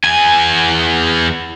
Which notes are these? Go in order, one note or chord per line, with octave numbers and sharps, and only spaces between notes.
E2 G#5